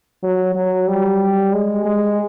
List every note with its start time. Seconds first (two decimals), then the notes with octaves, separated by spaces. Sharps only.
0.23 F#3
0.56 F#3
0.88 G3
1.53 G#3
1.85 G#3